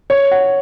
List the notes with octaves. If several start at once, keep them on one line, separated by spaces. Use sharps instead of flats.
C#5
F#5